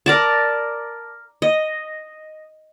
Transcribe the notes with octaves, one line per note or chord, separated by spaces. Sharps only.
A#4 D5 A5
D#5